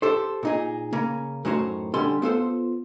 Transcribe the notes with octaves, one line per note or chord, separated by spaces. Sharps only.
G4 A4 C5
A#2 D#4 G#4
C#3 A#3 C#4
F#2 A2 D#4 C5 C#5
D3 G3 C#4 C6
B3 F4 A4 C5